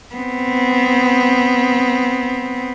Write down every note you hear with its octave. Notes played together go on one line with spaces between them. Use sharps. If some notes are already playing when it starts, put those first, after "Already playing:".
B3 C4